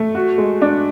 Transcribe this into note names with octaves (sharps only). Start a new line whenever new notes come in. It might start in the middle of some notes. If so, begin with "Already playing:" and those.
Already playing: A3
F#4
G#3
D4